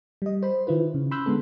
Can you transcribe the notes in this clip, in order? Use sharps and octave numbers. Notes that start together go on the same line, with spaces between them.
G3 D#5
C5 B5
D#3 E4 F4 B4
C#3
B5 C6 E6 F#6 G6
D3 G#3 B3 A4